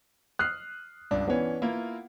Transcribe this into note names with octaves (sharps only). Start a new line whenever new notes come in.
D#6 F6 F#6 C7
C#2 G2 D4
E3 B3 C#4 D4
A#3 E4 F4